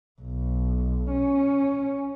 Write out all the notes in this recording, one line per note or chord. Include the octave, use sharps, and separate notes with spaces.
B1
C#4